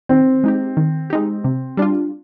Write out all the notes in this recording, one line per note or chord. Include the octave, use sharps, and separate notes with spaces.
D#3 C4
G#3 D#4 G4
D#3
G#3 D#4 G4
C3
G3 D4 F4